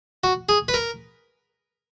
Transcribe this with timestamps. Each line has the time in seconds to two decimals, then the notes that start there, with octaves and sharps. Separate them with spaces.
0.24 F#4
0.49 G#4
0.68 B4
0.74 A#4